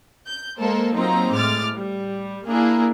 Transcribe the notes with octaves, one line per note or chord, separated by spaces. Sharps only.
G6
G#3 A#3 A4 A#4 C5
F#3 A#3 C4 D#4 F4 A#5
A2 G#3 D6 F6 A6
G3
A#3 D4 E4 G#4 A#4